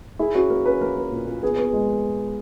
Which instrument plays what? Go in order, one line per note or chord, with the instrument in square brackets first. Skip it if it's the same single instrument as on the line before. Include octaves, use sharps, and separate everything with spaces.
[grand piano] E4 [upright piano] G#4
[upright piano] C#4 [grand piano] F#4
[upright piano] A#3 [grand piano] A#4
[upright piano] C#4 [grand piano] B4
[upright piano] A#3 [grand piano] A#4
[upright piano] A#3
A#2
A#2
[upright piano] B3 [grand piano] G#4
[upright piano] B3
G#3